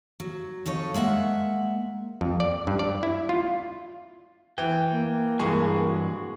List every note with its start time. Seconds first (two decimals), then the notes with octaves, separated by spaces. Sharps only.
0.20 F#3
0.66 F2 D#4 A4 C#5
0.94 G#3 A#3 E5 F#5
2.21 F2
2.40 D5
2.67 G2
2.79 D5
3.03 E4
3.29 F4
4.58 E3 G5
4.92 A#3
5.39 G2 E3 G#3 G#4 C#6
5.86 F#4